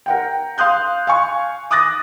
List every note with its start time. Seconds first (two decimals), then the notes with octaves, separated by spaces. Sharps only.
0.06 A#4 F#5 G5
0.58 F5 C6 D#6 F#6 G6
1.07 F5 G#5 C#6
1.71 D6 D#6 F#6 A6 A#6